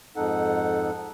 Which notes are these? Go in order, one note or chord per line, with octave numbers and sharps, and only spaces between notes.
F2 G#2 D#4 A4 F#5